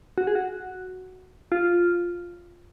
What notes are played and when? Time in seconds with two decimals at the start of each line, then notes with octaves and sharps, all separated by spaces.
0.18 F#4
0.27 G#4
0.35 F#4
1.52 F4